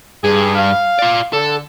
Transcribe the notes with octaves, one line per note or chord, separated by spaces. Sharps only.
G2 G#4
F5
F4 D5
D3 A4